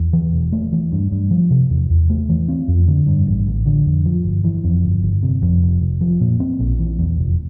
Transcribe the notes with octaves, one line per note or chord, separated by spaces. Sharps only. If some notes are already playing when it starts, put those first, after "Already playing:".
Already playing: E2
E3
E1
A3
E3
G2
G2
F3
C3
E2
E2
A3
E3
C4
F2
D3
G2
A1
A1
D3
F2
F3
G1
E3
F2
G1
G1
C3
F2
F1
F1
F3
A#2
C4
A#1
E3
E2
F1